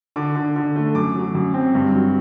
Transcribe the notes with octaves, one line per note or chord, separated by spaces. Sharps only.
D3 D6
D3
D3
A3
F#2 D6
F#3
F#2
C4
G2
F#3